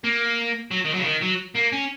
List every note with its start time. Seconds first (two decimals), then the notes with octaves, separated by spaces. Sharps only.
0.04 A#3
0.71 F#3
0.85 D#3
0.94 F#3
0.99 C#3
1.04 D#3
1.21 F#3
1.55 A#3
1.72 C#4